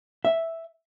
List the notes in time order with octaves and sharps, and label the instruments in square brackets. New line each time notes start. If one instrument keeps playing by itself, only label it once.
[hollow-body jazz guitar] E5